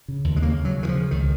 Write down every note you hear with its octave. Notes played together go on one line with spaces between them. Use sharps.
C#3
D#2
G#3
C#3 A#3
C#3
F#3
C#3
D#3
F3
C#3
C#2 D#3